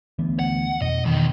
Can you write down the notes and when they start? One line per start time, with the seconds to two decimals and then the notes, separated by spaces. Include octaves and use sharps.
0.19 D2 E3 B3
0.39 F#5
0.82 F2 B2 D#5
1.05 E2 B2 D#3